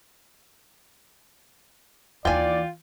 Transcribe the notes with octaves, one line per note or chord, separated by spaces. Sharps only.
D#2 E3 F4 D5 G5 G#5